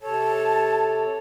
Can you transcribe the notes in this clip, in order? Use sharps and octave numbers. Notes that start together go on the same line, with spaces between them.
C3 A4 C#5 A5